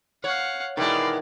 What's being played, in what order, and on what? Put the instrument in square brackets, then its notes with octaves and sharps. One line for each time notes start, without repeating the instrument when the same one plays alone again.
[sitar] C#5 [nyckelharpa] F5 F#5
[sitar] B2 G#3 [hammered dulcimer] D#3 E3 [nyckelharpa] D5